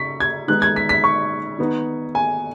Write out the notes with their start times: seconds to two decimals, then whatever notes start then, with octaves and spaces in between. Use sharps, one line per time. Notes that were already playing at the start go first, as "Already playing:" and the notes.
Already playing: C#3 D#4 C#6 B6
0.20 G#6
0.48 D#3 G#3 B3 D#4 F#6
0.62 G#6
0.76 B6
0.89 B6
1.04 C#6
1.59 D#3 B3 D#4
2.15 G#5